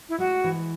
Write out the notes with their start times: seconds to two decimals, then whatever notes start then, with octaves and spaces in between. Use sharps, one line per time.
0.09 E4
0.18 G#3 F#4
0.44 E3